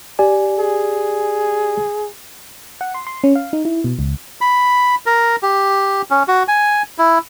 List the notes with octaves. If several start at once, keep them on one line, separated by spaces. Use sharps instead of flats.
G4 D5 G#5
G#4
F#5
C6
C6
C#4
F5
D#4
E4
B2
C#2
B5
A#4
G4
C#4
F#4
G#5
E4